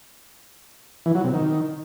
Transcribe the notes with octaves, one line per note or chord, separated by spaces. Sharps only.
E3
F#3
C3
D#3